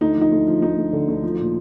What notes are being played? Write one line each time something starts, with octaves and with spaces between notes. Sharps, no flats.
D2 D#4
F3
D#4
D2
F3
D2 D#4
D2
D3
D2
F3
A#2